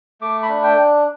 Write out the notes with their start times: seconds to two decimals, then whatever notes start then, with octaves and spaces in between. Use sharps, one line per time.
0.21 A3 D6
0.43 B5
0.49 D4
0.63 G5